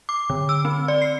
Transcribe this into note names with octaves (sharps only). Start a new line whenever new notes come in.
D6
D3
E6
C4
D5
C7